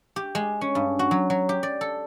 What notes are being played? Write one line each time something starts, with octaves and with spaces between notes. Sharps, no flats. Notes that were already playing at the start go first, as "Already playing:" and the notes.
G4
G#3
C#4
G2
F#4
F#3
F#3
G4
D5
A4